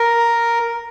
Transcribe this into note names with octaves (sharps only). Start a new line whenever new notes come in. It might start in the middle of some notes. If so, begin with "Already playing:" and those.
Already playing: A#4